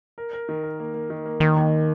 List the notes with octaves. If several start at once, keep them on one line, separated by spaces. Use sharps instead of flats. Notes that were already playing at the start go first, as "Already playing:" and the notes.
A#4
A#4
D#3
A#4
A#3
A#3
D#3
A#3
D#2 D#3
D#2